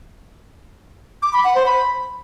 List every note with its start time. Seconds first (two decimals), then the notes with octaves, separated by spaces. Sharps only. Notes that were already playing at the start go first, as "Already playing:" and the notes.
1.22 D6
1.33 B5
1.44 F#5
1.55 C5
1.66 B5